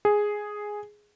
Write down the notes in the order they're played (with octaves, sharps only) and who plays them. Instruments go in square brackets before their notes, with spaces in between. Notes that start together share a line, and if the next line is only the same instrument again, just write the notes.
[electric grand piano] G#4